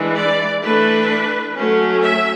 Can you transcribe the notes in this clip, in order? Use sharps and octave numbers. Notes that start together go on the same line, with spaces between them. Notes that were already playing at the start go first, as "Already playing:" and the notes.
Already playing: E3 G#3 D4
D5
E3 A3 D4 B4
F#3 A3 C#4
E5